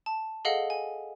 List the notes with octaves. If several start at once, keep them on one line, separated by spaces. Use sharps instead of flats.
A5
G#4 A4 D#5 F5 F#5
G#5